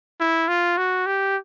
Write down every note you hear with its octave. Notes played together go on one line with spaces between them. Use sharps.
E4
F4
F#4
G4